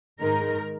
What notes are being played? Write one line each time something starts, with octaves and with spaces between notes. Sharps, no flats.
G#2 D#3 G#3 D#4 A#4